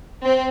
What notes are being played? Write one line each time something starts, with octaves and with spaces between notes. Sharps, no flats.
C4